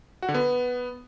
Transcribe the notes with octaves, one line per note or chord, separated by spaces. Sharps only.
F#4
D3
B3